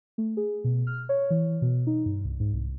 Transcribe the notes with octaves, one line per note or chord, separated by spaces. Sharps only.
A3
G#4
B2
F6
C#5
E3
B2
D#4
G2
C2
G#2
C2